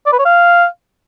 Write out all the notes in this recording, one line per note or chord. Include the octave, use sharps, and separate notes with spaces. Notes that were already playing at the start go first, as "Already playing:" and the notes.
D5
B4
C#5
F5